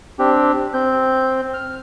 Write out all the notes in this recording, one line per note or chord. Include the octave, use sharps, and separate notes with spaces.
C4 D4 G4
C4 G6
F6